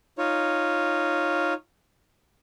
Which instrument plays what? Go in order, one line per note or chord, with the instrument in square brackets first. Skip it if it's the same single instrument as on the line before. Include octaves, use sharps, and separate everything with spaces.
[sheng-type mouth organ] D#4 F4 C#5